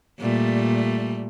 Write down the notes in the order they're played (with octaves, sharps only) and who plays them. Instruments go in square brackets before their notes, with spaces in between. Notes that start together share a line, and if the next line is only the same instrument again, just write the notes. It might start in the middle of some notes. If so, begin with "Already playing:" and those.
[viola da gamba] A#2 G3 A3